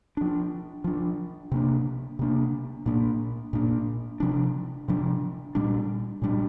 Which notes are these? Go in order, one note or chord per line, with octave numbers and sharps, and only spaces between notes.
F3 D4
F3 D4
C3 A#3 D4
C3 A#3 D4
A#2 A#3 D4
A#2 A#3 D4
C3 F3 D4
C3 F3 D4
A#2 G3 D4
A#2 G3 D4